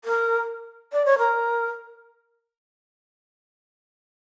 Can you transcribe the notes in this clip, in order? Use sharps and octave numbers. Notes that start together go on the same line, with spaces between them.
A#4
D5
C#5
A#4